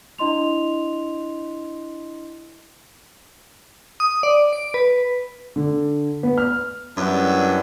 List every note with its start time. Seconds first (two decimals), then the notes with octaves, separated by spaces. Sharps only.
0.18 D4 E4 D#5 C6 F7
4.00 D#6
4.23 D5
4.53 D7
4.74 B4
5.56 D3
6.23 B3
6.37 F6
6.97 F#2 G3 B3 D4 E4